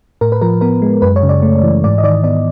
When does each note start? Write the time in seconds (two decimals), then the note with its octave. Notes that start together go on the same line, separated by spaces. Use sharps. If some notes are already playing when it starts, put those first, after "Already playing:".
0.21 A2 A#4
0.32 B4
0.41 F3 A#4
0.61 B3 A#4
0.82 G#3
1.02 F#2 B4
1.16 C#5
1.23 C#3
1.29 D5
1.42 A3
1.63 E3
1.84 G#2 D5
1.98 D#5
2.03 D#3 D5
2.23 B3 D5